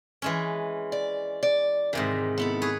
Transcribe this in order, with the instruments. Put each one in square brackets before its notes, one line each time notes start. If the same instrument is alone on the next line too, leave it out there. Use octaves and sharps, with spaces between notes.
[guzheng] E3 G#3 C#4
[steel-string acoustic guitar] D5
D5
[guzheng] G#2 C3 D#3 [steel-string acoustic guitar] E3
[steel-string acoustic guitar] B3 E4 A4
[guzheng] G#4 B4 C#5